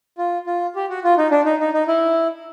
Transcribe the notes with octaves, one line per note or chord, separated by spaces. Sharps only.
F4
F4
G4
F#4
F4
D#4
D4
D#4
D#4
D#4
E4